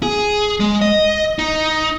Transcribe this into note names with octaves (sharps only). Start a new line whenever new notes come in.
G#4
G#3
D#5
D#4